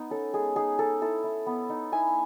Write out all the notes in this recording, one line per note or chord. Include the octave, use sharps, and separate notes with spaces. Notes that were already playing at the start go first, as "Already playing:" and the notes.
Already playing: B3 D#4
C#4 A4
G#3 G#4
D#4 G#4
D#4 A4
E4 A4
E4
B3
D#4
E4 G#5